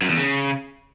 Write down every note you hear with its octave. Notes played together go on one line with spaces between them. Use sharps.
F#2
E2
C#3